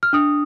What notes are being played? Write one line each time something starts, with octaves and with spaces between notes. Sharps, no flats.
F6
D4 D#6